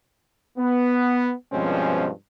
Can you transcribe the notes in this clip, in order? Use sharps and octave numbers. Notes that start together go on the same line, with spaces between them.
B3
G2 B2 F3 G#3 C4 C#4